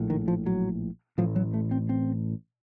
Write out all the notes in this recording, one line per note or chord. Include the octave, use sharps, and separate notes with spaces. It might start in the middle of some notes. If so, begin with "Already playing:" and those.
Already playing: A#1 A2
D#3
F3
F#3
A1 A2 F3
F#3
A3
C4
C4